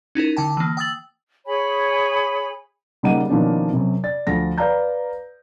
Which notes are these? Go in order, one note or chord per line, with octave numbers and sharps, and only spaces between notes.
C#4 D#4 E4 A#4
D3 G5 A5
E3 A#3
G5 D#6 E6 A6 F#7
G#4 C#5 G#5 B5
C#3 G3 A#3 D#4 F#5 D#7
B2 D#3 F3 A#3 C#4 D4
F#2 C3
D5 A6
D2 F3 A#6
B4 D5 F5 G5 A#5 G6